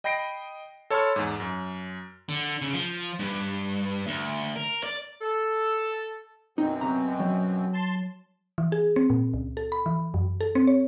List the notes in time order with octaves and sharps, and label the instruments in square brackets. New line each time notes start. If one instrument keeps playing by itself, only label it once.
[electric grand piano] D#5 G5 B5 A#6 C7 D7
A4 C#5 A5 B5 C6 F6
E2 G#2
F#2
[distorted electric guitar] D3
C#3
F3
G2
D2
A#4
D5
[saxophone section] A4
[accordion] F#2 B2 C4 [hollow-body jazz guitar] D#4
[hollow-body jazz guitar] C3 A#5
F#3
[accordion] A5 C6
[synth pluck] E3
G#4
C4
A#2
C#2
A4
B5
E3
F#2
A4
C4
C#5